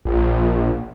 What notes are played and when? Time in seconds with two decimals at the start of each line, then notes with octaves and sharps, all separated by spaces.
0.05 A#1